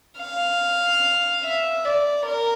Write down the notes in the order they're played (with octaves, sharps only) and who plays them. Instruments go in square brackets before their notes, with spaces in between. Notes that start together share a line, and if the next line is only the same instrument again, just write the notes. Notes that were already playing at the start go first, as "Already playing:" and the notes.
[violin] F5
E5
D5
A#4